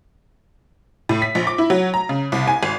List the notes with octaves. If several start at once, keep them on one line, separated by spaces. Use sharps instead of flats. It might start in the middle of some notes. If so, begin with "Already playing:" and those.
A2
B6
A#1
D6
E4
F#3
A#5
C#3
C2
G#5
G#1